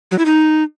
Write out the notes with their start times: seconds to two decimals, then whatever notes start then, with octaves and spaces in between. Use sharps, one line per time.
0.11 F#3
0.18 E4
0.26 D#4